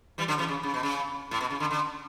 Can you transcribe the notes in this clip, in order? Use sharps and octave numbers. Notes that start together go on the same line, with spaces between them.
E3 G3
D3 F#3
C#3 E3
C#3
C#3
B2
C#3
A2
B2
C#3
D3
D3